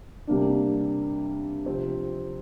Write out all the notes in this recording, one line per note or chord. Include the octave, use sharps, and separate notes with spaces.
C3 G3 A#3 D4
C3 F3 C4